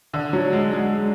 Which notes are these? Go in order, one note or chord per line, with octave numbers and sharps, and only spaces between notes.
D3
F#3
G#3
G#3